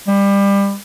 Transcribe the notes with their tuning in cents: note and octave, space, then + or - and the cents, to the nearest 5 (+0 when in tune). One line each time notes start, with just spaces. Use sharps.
G3 +25